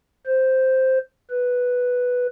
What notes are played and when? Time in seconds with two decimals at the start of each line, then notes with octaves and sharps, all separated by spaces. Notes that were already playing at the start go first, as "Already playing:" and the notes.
0.26 C5
1.30 B4